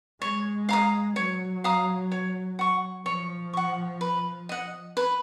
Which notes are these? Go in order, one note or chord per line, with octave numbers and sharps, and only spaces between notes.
G#3 C#5
F5 A#5 D#6
F#3 C#5
F5 A#5 D#6
C#5
F#5 C#6
F3 C#5
F#5 C#6
B4
D#5 F#5
B4